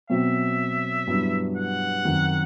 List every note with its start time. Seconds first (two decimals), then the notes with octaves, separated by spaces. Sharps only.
0.10 B2 F#3 C4 E5
1.07 G2 F#3 B3 E4
1.57 F#5
2.05 F#2 D#3 F#3 C4